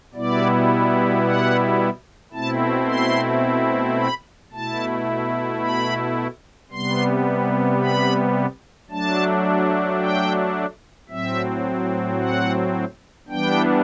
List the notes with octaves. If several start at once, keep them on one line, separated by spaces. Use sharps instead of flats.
B2 G3 B3 E4 D5
F#5
B2 A3 C4 E4 A5
C6
B5
B2 A3 E4 A5
B5
C3 G3 B3 C6
B5
F#3 A3 D4 A5
G5
A2 F#3 C4 E5
F#5
E3 G3 B3 D4 G5